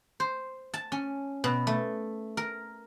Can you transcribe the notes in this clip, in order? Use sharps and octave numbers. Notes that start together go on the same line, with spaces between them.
C5
A5
C#4
B2
A3
A#4